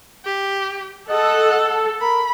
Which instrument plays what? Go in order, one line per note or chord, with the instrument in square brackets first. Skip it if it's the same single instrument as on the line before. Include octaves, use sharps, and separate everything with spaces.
[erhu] G4
[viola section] A4 [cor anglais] D#5 [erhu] F#5
[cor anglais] A#4 [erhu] B5